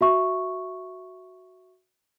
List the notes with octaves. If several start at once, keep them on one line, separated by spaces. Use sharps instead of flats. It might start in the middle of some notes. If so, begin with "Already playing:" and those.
F#4 E5 C#6